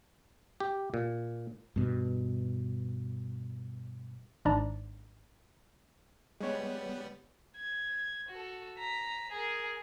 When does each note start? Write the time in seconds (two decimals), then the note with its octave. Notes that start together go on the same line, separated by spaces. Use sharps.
0.60 G4
0.94 A#2
1.76 G2 B2
4.45 G#1 G#2 D4 D5 A#5
6.40 G3 G#3 B3 C#5
7.57 G#6
8.29 F#4 A4
8.79 A#5 B6
9.32 G#4 A#4